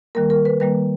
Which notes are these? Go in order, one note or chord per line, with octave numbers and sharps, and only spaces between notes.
D#3 G3 A#3 A#4
A#4
B4
D#3 G3 A#3 B4